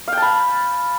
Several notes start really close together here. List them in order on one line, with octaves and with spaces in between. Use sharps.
F5 G5 A5 B5